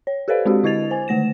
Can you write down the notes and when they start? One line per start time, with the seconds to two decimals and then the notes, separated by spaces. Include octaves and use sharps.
0.07 C#5
0.28 G4 A4 B4 C5 D5 F5
0.45 G#3 C4 D4 F#4 G4
0.64 D3 E4 D#5 G#6 A6 F7
0.91 C5 G#5
1.08 D3 D#3 A3 A#6 E7